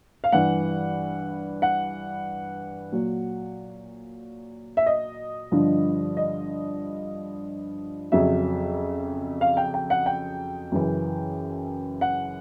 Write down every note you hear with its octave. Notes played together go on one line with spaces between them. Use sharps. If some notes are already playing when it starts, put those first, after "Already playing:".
F5
G2 E3 F#5
F#5
A#2 F#3
E5
D#5
G2 D3 F3
D#5
F2 C#3 F#3 E5
F5
G5
G5
F#5
G5
F#2 C#3 E3
F#5